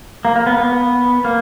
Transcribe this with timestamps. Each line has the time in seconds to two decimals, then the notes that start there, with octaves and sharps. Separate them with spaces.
0.25 A#3
0.36 A#3
0.47 B3
0.58 B3
1.25 A#3